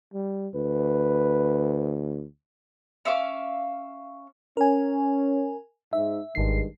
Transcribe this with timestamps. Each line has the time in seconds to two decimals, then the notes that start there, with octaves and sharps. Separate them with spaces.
0.14 G3
0.55 D2 B4
3.05 C#4 E5 F5 D6
4.57 C#4 A#4 G#5
5.93 G#2 E5
6.35 G#1 G2 D#3 G#3 C7